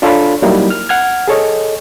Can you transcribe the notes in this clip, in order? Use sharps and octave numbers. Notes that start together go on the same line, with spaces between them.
D4 F4 A4 C#5 F5 B5
F#3 G3 A#3 D#4 E4
F6
F#5 F6 G#6
G#4 A4 C#5 D#5